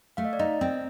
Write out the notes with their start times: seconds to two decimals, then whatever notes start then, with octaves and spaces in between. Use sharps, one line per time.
0.17 A3 F5
0.25 D#5
0.33 D5
0.39 D#4 D#5
0.61 C4